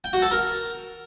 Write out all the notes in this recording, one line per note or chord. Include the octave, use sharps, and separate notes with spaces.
G5
F#4
A4
A#4